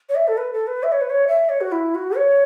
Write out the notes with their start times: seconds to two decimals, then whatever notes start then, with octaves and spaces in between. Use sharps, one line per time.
0.09 C#5
0.15 E5
0.28 A4
0.37 B4
0.53 A4
0.67 B4
0.83 E5
0.92 C#5
1.01 B4
1.10 C#5
1.28 E5
1.49 C#5
1.61 F#4
1.72 E4
1.95 F#4
2.16 C#5